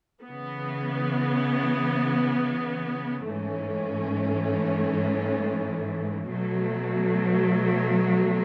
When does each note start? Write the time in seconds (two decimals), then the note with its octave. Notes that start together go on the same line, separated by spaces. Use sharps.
0.24 C#3 E3 B3
3.27 G#2 E3 A3 C#4
6.29 B2 F#3 A3